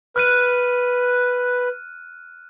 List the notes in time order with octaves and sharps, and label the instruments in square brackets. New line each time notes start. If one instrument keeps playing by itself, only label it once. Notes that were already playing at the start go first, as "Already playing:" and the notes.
[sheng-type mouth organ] B4 [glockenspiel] F6 F#6 D#7